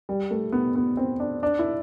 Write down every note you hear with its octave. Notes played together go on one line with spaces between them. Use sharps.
G3
A3
B3
B3
C4
D4
D4
E4